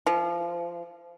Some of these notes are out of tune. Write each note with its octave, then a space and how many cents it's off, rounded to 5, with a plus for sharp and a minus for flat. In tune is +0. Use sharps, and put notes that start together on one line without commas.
F3 -25